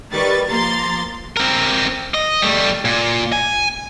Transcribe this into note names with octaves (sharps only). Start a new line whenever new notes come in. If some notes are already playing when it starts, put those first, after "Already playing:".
D#3 G3 B4 C#6 A6
F3 A#3 A#5 C6 A6
C4 A#4
D#5
G3 A3
A#2
G#5